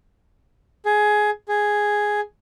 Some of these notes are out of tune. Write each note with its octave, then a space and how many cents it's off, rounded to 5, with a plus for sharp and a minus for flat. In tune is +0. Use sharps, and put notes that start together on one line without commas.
G#4 +15
G#4 +0